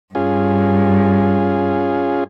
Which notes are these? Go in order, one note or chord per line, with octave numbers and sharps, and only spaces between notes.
G2 C#4 F4 G#4